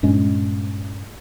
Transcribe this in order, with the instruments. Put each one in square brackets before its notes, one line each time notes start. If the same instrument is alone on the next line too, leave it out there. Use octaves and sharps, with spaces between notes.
[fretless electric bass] G2 A#2 G#3 C#4